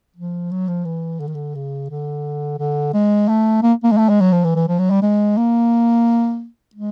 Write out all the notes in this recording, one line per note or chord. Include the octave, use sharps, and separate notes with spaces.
F3
F#3
F3
E3
D3
D#3
D3
C#3
D3
D3
G#3
A3
A#3
A#3
G#3
A3
G#3
F#3
F3
E3
E3
F3
F#3
G3
G#3
A#3
G#3